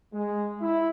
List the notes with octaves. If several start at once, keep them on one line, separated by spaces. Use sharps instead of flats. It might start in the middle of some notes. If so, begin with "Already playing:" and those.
G#3
E4